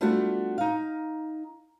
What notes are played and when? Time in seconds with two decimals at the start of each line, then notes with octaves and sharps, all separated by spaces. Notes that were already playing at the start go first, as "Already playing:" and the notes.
0.01 G3 A3 B3 D4 F4 F#4
0.58 D#4 F5